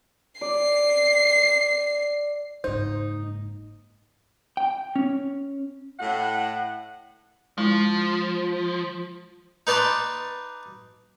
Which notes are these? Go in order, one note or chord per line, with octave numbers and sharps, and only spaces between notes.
D5 C7
F#1 G#2 D#4 C5
G5
C#4
A2 F#5
F3 G#3 E4
D#4 B4 D5 A5 C6